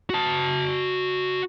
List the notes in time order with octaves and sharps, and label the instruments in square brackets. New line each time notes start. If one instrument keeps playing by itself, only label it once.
[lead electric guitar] F#4 A5